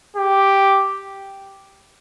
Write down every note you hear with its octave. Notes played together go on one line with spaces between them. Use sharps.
G4